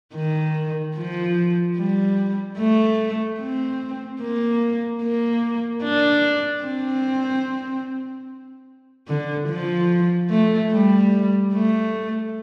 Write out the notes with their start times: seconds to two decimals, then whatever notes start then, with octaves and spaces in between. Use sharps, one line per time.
0.15 D#3
0.96 F3
1.77 G3
2.58 A3
3.40 C4
4.21 A#3
5.02 A#3
5.84 D4
6.65 C4
9.08 D3
9.49 F3
10.30 A3
10.72 G3
11.53 A3